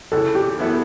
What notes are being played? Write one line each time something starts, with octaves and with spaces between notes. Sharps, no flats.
C#2 C#3 E3 A4
G4
F#2 E3 B3 E4 A4